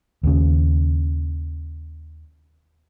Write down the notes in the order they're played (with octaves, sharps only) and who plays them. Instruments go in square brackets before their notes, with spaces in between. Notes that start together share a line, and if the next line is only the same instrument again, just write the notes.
[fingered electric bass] D#2 C#3